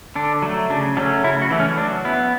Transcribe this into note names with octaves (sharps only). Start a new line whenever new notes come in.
D3 D4
F#3 A3
C#3 D4
F#3 A3 C#4 D4
C#3 E4
F#4
E3 A3
C#4
F#3 D4
B3 E4